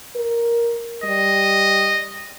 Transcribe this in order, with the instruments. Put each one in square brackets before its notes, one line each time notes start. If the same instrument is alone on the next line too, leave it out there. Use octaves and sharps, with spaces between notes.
[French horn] A#4
[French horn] G3 [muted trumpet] D#5